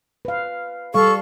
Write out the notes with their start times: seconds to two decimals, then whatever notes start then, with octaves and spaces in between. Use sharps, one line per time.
0.25 B4 F5
0.94 G3 A4 F5 C#6